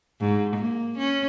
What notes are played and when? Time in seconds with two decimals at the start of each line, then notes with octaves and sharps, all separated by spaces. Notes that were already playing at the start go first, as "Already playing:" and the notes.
0.20 G#2
0.56 A#3
0.97 C#4